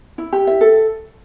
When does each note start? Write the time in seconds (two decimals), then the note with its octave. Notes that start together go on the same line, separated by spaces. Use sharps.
0.18 E4
0.33 G4
0.47 E5
0.61 A4